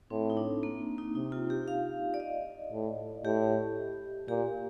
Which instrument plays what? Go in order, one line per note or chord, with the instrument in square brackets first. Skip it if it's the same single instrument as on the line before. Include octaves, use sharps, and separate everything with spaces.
[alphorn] A2 [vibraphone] C4
[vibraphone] D#4
D4
A#3
D#4
[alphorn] C3 [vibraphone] D#4
[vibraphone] F4
G4
F5
D5
D#5
[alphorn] A2
[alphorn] A2 [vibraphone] G4
[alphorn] A#2 [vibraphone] G4